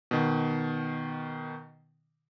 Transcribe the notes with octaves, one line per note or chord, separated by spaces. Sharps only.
B2 D#3